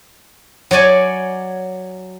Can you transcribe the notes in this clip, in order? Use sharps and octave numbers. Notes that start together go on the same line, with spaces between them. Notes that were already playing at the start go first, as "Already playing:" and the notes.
F#3 C#5 D5 G#5